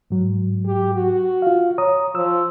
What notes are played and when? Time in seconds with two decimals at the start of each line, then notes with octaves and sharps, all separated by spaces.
0.10 G#2 F#3
0.66 G4
0.95 F#4
1.42 F4 F5
1.78 C#5 A#5 D#6
2.15 F3 E6